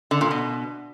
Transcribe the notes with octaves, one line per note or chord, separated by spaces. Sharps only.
D3
A#2
B2